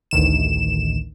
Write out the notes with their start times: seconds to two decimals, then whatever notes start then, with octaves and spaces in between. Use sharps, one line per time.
0.11 A1 D2 D#3 E7